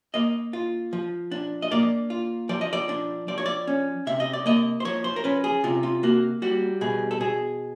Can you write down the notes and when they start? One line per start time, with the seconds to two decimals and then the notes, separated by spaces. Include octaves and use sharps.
0.14 A#3 D#5
0.53 F4
0.93 F3
1.31 D4
1.62 D#5
1.72 A#3 D5
2.10 F4
2.49 F3 D5
2.61 D#5
2.73 D5
2.89 D4
3.28 F3 D5
3.38 C#5
3.46 D5
3.67 C#4
4.07 C3 E5
4.20 D#5
4.33 D5
4.46 A#3 D#5
4.80 C5
4.85 F3 C#5
5.04 C5
5.16 A#4
5.24 C#4 B4
5.44 G#4
5.64 C3 F4
5.83 F4
6.03 A#3 F#4
6.42 G3 F#4
6.81 B2 G#4
7.11 A4
7.20 B2 G#4